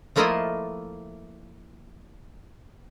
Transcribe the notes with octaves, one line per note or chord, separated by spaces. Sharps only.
F3 A3 A#3 E4 F4 D#5